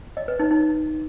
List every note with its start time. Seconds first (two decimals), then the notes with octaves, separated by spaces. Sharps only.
0.17 D#5
0.28 B4
0.39 D#4
0.51 D#4